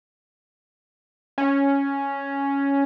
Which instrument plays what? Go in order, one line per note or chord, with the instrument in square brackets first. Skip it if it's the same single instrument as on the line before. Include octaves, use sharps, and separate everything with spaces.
[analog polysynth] C#4